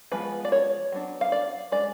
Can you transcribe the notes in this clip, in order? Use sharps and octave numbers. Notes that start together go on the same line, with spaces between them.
F3 G#3 B3 B4
D5
C#5
F#3 B3 D4
F5
D5
G#3 D4 D5